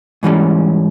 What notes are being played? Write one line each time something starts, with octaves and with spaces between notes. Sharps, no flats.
G#2 E3 G3 C#4